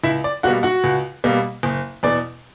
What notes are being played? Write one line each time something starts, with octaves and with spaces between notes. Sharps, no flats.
C#2 E4 E5
D5
B2 G3 A#3 F#4 F#5
F#4 F#5
C#2
B2 G3 A#3
F#1
E2 B2 D5 D6